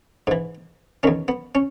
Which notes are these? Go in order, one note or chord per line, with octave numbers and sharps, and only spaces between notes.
G#2 E3
E2 D#3 C#4
B3
C#4